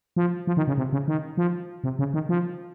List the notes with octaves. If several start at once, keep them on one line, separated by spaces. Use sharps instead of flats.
F3
F3
D#3
C#3
C3
C#3
D#3
F3
C3
C#3
D#3
F3